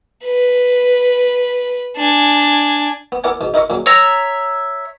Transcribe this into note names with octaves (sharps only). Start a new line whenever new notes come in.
B4
D4 G#5
B3
B3 E4 A#4 D5 F#5 G#5
G#2 B2
D#4 E4 A#4 D#5 E5 C#6
A#2 C#3 F#3
C#5 E5 A#5